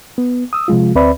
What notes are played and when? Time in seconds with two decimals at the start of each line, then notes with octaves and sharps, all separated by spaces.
0.18 B3
0.53 D#6 E6
0.68 C3 F3 G#3 F4
0.95 D2 C4 B4 D5 E5 B5